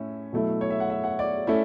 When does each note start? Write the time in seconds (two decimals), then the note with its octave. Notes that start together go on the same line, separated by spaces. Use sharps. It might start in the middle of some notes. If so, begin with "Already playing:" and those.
Already playing: A2 C#4 E5
0.32 B2 F#3 A3 E4
0.61 C#5
0.70 E5
0.80 F#5
0.90 E5
1.04 F#5
1.19 D5
1.47 A3 C#4 E4